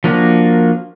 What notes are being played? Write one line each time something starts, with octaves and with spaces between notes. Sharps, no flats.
F3 A#3 D4 F#4 A#4